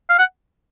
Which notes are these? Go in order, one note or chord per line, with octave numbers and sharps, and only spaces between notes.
F5
F#5